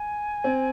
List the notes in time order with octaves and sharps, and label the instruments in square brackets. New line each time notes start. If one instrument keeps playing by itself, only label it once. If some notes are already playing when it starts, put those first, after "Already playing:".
Already playing: [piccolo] G#5
[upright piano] C4